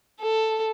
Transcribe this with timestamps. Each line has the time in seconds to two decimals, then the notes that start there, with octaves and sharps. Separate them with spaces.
0.21 A4